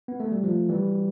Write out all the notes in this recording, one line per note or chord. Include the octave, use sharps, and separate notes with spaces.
B3
A3
G3
F3 A3
E3 G3